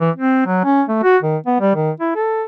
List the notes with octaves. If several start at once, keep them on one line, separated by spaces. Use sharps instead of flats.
E3
C4
F#3
C#4
A3
F#4
D#3
B3
G3
D#3
E4
A4